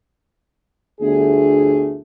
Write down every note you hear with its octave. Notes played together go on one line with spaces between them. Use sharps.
G1 D2 A3 G#4